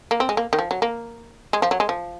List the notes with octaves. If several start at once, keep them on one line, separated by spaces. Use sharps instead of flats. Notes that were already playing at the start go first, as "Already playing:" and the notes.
A#3
C4
G#3
A#3
D#3
F3
F#3
A#3
G#3
F3
F#3
G#3
F3